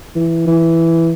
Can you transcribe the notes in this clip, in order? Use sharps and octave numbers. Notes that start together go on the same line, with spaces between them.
E3
E3